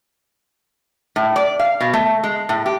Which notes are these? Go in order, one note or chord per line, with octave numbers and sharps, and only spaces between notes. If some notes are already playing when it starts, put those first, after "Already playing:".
A2
D5
F5
B2
A3
G#3
A2
G4